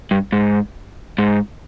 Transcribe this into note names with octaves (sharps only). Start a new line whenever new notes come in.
G2
G#2
G#2